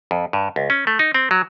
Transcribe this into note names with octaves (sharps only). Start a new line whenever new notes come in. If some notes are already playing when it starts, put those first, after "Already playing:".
F2
G2
C#2
C#4
A3
D#4
C4
F#3